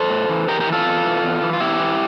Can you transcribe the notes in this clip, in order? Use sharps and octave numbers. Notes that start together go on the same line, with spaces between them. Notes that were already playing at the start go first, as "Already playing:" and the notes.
Already playing: A4 C5
A2
E3
E2 G4 A#4
G4 A#4
E3
F4 A4
E2
E3
E2
E3
F4
E2 E4 G4
E3